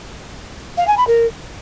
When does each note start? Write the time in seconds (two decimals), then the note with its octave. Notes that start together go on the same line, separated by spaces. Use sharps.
0.77 F5
0.87 G#5
0.97 B5
1.07 A#4